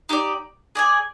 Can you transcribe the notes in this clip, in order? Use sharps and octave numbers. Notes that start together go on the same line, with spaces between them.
D#4 G4 D5
G#4 D5 G#5